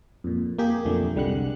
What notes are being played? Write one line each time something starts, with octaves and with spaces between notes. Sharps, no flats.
F2 A#2
A#3 G4 G#4
B1 F2 D3 A3
C2 D3 G3 G#3 F#5 F#6